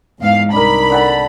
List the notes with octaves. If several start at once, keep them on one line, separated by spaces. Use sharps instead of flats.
E2 G#2 F5
C2 D4 D#4 A#4 B5
D3 F#5 A5